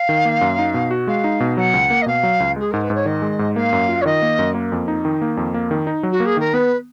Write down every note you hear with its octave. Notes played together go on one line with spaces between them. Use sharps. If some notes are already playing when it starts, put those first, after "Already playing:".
Already playing: F5
D#3
A#3
F#2
D#4
B2
F#4
G#3 F5
D#4
B2
F#3 F#5
C#2
A#3
D#5
B2 F5
F#3
C#2
G#3 G#4
G#2 A#4
B4
G#2 C#5
D#3 D#5
G#3
G#2
A#3 F5
F#2
F4
C#5
D#3 D#5
A#3
F#2
A#3
F2
D#4
D#3
A#3
F2
A#3
D#3
D#4
F#3
F#4
A#3
G#4
D#3 A#4
B3 B4